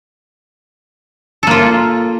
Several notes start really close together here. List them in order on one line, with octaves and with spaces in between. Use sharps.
A4 A#3 F4